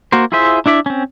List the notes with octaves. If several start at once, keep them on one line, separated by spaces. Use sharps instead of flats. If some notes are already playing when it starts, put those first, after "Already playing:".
A#3 F#4 A#4 C5
E4 F4 G#4 C5 E5
D4 E4 D5 E5
C4 C#4